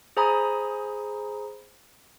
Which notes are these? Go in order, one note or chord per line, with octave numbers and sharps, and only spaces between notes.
G#4 C5 G#5 A#5 B5 D#6